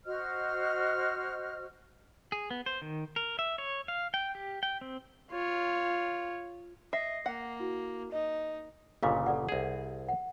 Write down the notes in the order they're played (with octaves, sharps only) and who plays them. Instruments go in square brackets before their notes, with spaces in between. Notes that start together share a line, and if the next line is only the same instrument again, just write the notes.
[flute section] F#4 C5 D#5 F6
[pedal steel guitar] G#4
B3
C5
D#3
A#4
E5
C#5
F5
G5
G4
G5
C4
[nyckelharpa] F4 C#5
[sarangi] D#5 [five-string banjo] E5 [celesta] A#6 C7
[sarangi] A#3 [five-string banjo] F#5
[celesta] E4 F#4
[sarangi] D#4 [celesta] D#5
[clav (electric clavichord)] G1 A#2 C#3 [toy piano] D#5 F5 D6
[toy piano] A4 D5 F#5
[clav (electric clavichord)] C2 G#4
[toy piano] F#5